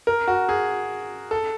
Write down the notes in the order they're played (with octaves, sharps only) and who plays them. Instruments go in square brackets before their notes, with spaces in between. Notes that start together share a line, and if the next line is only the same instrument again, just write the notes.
[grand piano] A#4
F#4
G#4
A4